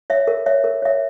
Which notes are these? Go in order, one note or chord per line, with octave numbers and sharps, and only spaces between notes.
C#5 E5
A#4
C#5 E5
A#4
C#5 E5